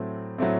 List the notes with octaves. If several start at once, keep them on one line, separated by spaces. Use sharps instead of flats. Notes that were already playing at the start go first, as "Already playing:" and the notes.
Already playing: A2 F#3 A3 C4
A2 F#3 A3 C4